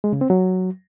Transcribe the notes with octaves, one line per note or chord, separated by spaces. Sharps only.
G#3
C#3
C4
F#3